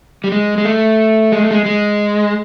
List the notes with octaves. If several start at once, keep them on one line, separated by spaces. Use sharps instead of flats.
G3
G#3
G#3
A3
G#3
A3
G#3
G#3